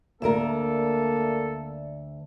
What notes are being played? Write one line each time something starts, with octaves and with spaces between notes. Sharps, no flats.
D2 A#3 A4 A#4 D5 E5